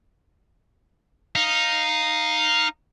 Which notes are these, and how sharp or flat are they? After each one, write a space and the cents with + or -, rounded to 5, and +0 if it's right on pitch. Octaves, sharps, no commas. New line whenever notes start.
D#4 -5 F5 +0